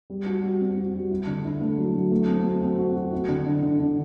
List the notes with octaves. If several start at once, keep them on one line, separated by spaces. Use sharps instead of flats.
G3
F#4
G3
C4
F#4
G3
E4
D3
E4
A3
F#3
F#3
A3
C4
F#4
C4
F#4
F#4
E4
D3
D3
D3
D3